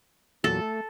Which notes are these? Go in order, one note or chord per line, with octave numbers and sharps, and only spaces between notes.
E2 A#2 F#3 A4
A3